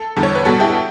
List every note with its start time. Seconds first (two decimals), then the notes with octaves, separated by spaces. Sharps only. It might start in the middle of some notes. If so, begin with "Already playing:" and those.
Already playing: A4
0.16 E2 D3 G3
0.23 C#5
0.35 B4
0.45 B2 G3 F#4 A4
0.60 E4 G4